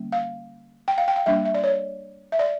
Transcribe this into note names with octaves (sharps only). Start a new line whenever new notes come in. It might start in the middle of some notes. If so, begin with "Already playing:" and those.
Already playing: D3 G3 A#3 C#4
F5
G5
F5
G5
F5
G3 A#3 D4 E5
E5
D5
C#5
E5
D5